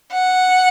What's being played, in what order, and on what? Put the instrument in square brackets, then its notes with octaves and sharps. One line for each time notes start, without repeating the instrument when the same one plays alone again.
[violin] F#5